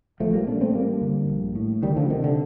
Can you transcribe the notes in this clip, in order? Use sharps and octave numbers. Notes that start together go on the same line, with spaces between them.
A#1 F3 A3
G3 A#3
A#2 A#3 D4
A3 C4
A1 G3 A#3
G2 D3
A#1
A2
D2 D#3 G3
D3 F3
C3 D#3
D3